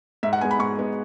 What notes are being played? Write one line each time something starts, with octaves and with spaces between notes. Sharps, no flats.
G#2 E5
F#5
G#3 B3 G#5
B5
G#2 C#6
G#3 B3